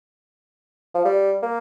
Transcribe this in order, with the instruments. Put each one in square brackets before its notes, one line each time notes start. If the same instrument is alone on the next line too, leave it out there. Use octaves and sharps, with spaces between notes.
[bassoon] F3
G3
A#3